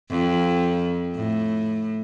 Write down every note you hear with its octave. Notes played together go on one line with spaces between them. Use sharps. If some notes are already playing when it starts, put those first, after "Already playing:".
F2
A2